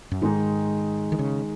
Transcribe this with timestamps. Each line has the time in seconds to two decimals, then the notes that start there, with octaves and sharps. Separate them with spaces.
0.12 F#2
0.21 G#2 D#3 G#3 D#4
1.12 D#3
1.19 C#3